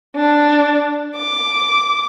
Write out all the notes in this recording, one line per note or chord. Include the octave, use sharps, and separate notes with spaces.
D4
D6